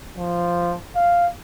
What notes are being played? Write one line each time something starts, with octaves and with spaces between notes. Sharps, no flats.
F3
F5